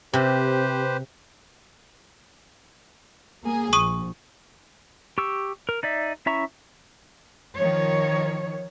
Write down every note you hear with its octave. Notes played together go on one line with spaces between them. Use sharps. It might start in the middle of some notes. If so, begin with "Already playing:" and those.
C3 G4 B4 C5
A#3 G#4
A#1 C#6 D#6 D#7
G4 C#6 E6
A#4
D#4 D5 E5
C#4 E4 E5 A#5 C#6
D#3 F3 C#5